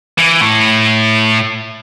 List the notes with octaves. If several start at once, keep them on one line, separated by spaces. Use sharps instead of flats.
E3
A2